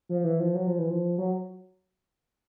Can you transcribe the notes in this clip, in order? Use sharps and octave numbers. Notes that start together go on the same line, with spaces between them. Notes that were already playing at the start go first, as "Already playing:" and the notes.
F3
E3
F3
F#3
F3
E3
F3
F#3